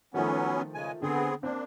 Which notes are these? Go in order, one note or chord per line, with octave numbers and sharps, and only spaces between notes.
D#3 F3 F#3 A3 B3 C#4
C#3 G#3 G#5
D3 B3 C4 G#4
A#3 C4 D4